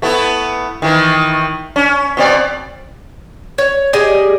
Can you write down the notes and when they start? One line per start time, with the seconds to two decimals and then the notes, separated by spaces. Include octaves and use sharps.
0.02 A3 B3 E4
0.82 D#3 E3
1.76 C#4
2.17 B2 C4 D5
3.58 C#5
3.93 G4 G#4 D5 D#5